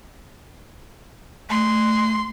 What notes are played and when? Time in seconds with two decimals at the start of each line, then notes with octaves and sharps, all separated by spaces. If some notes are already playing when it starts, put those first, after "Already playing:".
1.50 A3 C6